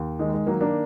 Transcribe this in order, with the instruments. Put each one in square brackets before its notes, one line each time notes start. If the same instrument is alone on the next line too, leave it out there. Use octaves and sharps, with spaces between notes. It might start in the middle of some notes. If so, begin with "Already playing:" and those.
Already playing: [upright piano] D#2
D#3 G#3
G#3
D#3 F#3 A#3
A#3 D4